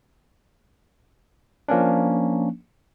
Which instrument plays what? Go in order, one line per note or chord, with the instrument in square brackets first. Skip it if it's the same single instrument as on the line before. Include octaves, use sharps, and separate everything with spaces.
[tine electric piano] F3 A#3 C#4 D4